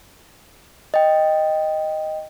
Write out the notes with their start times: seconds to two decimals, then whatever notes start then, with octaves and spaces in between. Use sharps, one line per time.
0.94 D#5 G5